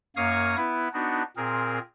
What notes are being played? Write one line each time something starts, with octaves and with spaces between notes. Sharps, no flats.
F#2 A#3 C#5 F5 C#6 D#6
B3 E4 B4
B3 D4 D#4 F#4
A#2 C4 G#4 A#4